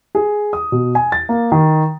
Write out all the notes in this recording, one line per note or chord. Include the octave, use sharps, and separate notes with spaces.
G#4
D#6
B2
G#5
A6
A#3
D#3